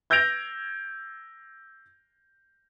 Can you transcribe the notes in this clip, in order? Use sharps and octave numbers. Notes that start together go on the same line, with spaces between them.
E6 G6 G#6 A#6 D7 F7